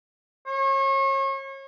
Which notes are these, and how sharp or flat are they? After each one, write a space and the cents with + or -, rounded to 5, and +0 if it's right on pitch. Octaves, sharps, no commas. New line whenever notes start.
C#5 -35